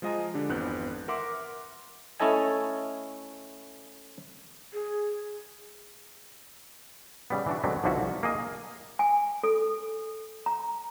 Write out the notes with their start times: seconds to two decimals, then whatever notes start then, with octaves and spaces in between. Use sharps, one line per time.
0.02 F3 G#3 F4 D#5 G#5 A#5
0.34 D3 D4 G4
0.49 G#1 F2 E3 B3 F#6 G6
1.08 A#4 E5 F#5 C6 D6
2.20 A3 C#4 E4 A4 D#5 G#5
4.73 G#4
7.30 C#3 G3 B3
7.47 E3 D4 F#4
7.64 D3 F#3 G#3 B3 C4
7.84 B1 D3 F3 E4 F#4
8.00 C2
8.23 A#3 G#4 D#5
8.99 G#5
9.43 A4
10.46 A#5